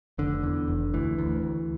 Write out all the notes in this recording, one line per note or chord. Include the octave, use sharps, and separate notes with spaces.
F1 D3
E2
F1
D2 E3
D2
D2